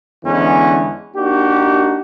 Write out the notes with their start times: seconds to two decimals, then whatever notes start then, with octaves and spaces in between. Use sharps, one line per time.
0.25 E2 D3 E3 G#3 B3 C#4
1.15 A#3 D4 D#4 F#4 G4